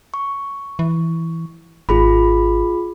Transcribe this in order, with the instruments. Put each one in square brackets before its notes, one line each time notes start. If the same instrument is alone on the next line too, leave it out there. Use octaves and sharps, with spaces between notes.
[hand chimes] C#6
[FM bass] E3
[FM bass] G#1 [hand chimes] F4 G#4 B5